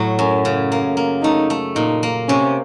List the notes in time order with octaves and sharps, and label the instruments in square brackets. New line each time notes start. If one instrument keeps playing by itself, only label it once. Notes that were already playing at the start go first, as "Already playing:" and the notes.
Already playing: [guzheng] A2 F#3
[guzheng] F#2 [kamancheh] C#4
[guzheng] C#3
A#3
A#3
[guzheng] A3 [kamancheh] D#4
[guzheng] A3
[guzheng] A#2 [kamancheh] D#4
[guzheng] A#3
[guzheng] C3 [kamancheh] C#4